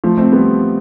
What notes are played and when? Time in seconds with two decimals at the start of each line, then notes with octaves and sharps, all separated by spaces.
0.04 F3 A3
0.18 A3 C4
0.32 G3 B3